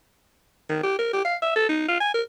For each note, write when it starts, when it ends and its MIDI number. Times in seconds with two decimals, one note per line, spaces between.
0.69 0.82 51
0.83 0.97 67
0.99 1.11 70
1.13 1.25 67
1.25 1.36 77
1.42 1.51 76
1.56 1.67 69
1.69 1.84 63
1.88 2.00 65
2.00 2.14 80
2.14 2.22 70